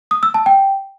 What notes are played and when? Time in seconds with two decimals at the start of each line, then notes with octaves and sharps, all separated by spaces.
0.11 D#6
0.23 E6
0.34 A5
0.46 G5